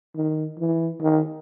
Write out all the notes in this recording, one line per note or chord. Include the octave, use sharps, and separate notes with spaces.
D#3
E3
D#3